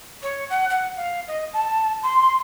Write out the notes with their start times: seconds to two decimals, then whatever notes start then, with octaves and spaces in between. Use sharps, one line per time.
0.23 C#5
0.50 F#5
0.70 F#5
0.97 F5
1.27 D#5
1.53 A5
2.03 C6